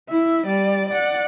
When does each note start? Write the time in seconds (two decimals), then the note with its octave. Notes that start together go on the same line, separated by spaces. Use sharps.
0.10 E4 E5
0.47 G3 D5
0.90 D5 F#5